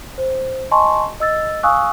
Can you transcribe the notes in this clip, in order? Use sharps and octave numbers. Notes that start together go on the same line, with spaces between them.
C5
D#5 G#5 A5 C6 C#6
D#5 E6 A6
F5 G#5 C#6 D#6 E6 F#6